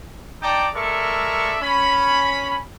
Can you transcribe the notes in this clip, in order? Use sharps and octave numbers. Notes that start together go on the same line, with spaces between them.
D#4 D5 G5 A5 A#5 D6
G#3 A4 A#4 D5 E5 C#6
C#4 B5